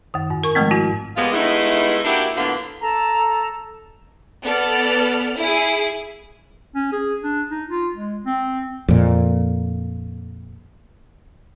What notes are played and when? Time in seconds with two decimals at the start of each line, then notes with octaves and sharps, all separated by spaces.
0.14 F#2 D#3
0.30 G#2
0.44 A#4 C#6
0.55 D#3 F3 G#3 A3 C4
0.71 G#2 E4 F#4
1.16 F3 G3 G#3 A#3 B3 F4
1.33 G2 G#3 A3 B3 D#4 E4
2.05 A#3 D4 E4 F#4 G4
2.36 A2 D3 A#3 B3 F4
2.81 A4 A5 A#5
4.45 B3 A4 D5 F6
5.38 E4 G#4
6.75 C#4
6.92 G#4
7.23 D4
7.51 D#4
7.69 F4
7.94 G#3
8.25 C4
8.88 F2 A#2